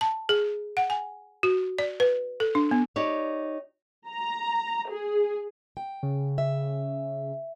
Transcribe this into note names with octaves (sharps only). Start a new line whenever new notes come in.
A5
G#4
F#5
G#5
F#4
D5
B4
A4
D4
B3
D#4 G4 C#5 D5
A#5
G#4
G5
C#3
E5